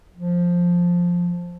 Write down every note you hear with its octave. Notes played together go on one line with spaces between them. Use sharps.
F3